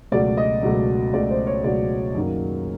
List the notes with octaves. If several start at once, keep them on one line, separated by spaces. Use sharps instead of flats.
C#2 B2 F#3 A3 D5
D#5
C#2 B2 F#3 A3
C#2 B2 F#3 A3 D5
C5
C#5
C#2 B2 F#3 A3 D5
F#2 D#3 F#3 A#3